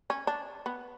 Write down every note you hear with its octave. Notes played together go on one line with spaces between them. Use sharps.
C#4
D4
B3